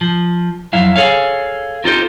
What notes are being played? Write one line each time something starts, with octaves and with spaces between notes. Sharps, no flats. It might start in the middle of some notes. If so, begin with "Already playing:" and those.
F3
F2 F#3 E4 F5
G#4 A4 C#5 F5
C4 D#4 F4 G4 A4 C5